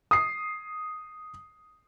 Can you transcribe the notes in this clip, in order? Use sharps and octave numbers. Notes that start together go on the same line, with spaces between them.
D#6 C7